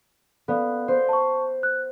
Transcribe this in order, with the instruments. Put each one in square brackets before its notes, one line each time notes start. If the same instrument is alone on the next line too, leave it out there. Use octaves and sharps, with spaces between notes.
[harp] B3 [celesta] A4 D5 F5
[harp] C5
[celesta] A5 C#6
F#6